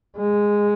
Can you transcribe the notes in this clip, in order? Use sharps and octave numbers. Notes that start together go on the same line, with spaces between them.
G#3